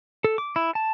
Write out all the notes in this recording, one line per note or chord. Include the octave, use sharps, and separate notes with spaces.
A4
D6
E4
A5